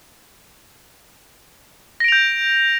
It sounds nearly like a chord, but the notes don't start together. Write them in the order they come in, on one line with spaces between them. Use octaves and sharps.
A#6 D7 F7 G6